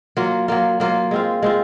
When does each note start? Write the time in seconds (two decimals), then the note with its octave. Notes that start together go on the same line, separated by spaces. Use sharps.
0.17 F#3 A#3 F4
0.48 F#3 A#3 F4
0.80 F#3 A#3 F4
1.11 G#3 C4 F4
1.42 G#3 C4 F4